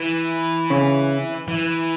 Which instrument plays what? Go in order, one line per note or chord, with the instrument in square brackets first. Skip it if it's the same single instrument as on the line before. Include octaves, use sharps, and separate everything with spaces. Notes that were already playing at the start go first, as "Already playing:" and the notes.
Already playing: [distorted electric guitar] E3
[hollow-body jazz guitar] C#3
[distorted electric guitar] E3